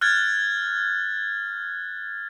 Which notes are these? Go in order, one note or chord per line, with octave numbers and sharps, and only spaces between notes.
F6 F#6 G#6 A6